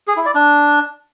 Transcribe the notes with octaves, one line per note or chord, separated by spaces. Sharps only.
G#4
E4
D5
D4